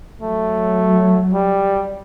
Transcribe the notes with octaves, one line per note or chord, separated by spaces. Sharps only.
F#3 A3
G3